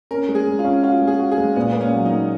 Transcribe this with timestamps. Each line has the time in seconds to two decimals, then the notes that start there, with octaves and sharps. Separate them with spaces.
0.11 C#4 A#4
0.29 G#3
0.35 G#4
0.47 G#3
0.59 F4
0.65 C#4
0.83 F4 F#4
1.02 G#3
1.07 G#4
1.19 F#4
1.31 G#4
1.38 G#3
1.56 A#2 B3
1.72 A#3 B3
1.81 C#4
1.93 F#3
2.05 D#4
2.11 A#3